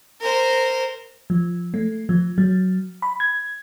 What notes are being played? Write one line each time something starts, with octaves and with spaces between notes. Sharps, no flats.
A#4 C5
F3
A3
F3
F#3
B5
G#6